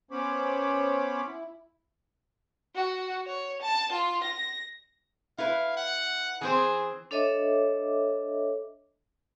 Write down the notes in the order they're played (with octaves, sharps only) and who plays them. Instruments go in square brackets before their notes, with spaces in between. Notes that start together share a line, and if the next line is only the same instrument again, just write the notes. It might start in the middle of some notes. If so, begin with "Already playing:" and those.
[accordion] B3 C#4 C5 C#5 B5 D6
E4
[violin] F#4
C#5
A5
F4
A#6
[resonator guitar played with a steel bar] E4 B4 [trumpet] F5
[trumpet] F#5
[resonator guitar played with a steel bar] E3 C4 C5 [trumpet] G#4
[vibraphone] D4 A4 C#5 D#5 E5 D6